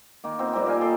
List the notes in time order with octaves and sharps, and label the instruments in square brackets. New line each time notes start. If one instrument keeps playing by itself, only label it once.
[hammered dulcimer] D#3 A#3
B3 C4 D#4 F4
A#2 G3 A#3 C4
A#4 F5 G5 G#5
D#4 A4 D5 C6